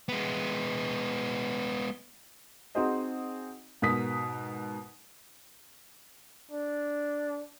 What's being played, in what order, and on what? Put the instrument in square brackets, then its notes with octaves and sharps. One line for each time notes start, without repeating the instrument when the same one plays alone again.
[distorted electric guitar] G#3 B3
[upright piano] C4 D#4 F#4 G#4 C5 D#5
G#2 B2 A#4 D#6 B6
[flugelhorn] D4